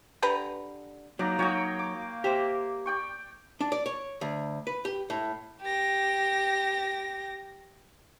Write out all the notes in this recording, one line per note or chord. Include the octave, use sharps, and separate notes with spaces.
D3 G4 B4 A#5
F#3 A#3 D#4 D5 A#5
F#3 F#4 C#5 D#5 G5
D6
G4 C5 E5
D5 G5 C#6
D4
D5
C#5
D2
B4
G4
A2
G4 A#6